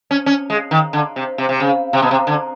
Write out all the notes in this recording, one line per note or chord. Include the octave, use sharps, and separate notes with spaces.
C#4
C#4
G#3
D#3
D3
C3
C3
C3
C#3
C3
B2
C3
D3